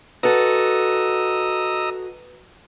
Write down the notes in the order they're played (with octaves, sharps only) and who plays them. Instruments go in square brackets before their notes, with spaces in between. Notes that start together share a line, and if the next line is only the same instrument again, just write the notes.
[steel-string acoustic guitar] F#4 A4 [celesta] B4 [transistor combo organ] D#5 A#5 E6